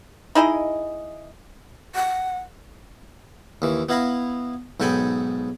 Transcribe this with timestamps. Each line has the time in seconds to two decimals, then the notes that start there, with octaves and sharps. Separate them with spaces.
0.35 D#4 E4 G#4 D#5
1.95 F#5
3.62 D#2 E3
3.89 B3 E4 F5 A#5 B5
4.80 B1 G#2 A4 G5 G#5 B5